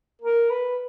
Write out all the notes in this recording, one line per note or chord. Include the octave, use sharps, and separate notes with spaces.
A#4
B4